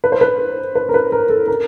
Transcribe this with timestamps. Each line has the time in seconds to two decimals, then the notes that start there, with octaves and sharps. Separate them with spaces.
0.04 B4
0.12 C5
0.21 B4
0.75 B4
0.89 A#4
0.94 B4
1.12 A#4
1.30 A4
1.48 A#4